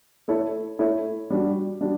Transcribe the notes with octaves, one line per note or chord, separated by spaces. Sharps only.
A3 E4 A4 C#5
A3 E4 A4 C#5
G3 D4 F#4
G3 D4 F#4